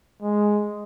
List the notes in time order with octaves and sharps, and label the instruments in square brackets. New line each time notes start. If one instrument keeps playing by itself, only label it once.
[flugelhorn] G#3